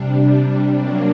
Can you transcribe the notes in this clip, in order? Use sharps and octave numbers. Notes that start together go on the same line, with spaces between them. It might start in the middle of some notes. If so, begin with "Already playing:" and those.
Already playing: C3 G3 D4
F#3 A#3 D4